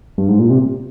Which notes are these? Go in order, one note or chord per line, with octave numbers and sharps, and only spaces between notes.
G2
G#2
A#2
C3